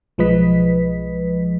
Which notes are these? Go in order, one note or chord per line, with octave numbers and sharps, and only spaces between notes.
B1 F3 G#3 B4 D#5 B6